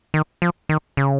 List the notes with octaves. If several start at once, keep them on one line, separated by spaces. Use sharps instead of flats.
D#3
F3
D#3
C#3